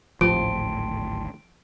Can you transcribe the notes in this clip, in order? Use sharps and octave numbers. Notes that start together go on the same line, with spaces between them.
D1 G#1 A2 F3 G5 A5 C6 D7